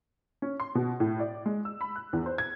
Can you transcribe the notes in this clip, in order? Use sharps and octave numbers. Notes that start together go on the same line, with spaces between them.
C#4
C6
B2
A2
D5
G#3
E6
B5
F#6
E2
C5
G#6